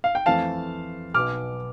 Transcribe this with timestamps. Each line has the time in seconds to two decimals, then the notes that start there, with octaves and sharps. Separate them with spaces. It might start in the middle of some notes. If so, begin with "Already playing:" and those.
0.04 F5
0.15 G5
0.26 F2 E3 A3 C4 F5 A5
1.14 B1 B2 B3 D6 F6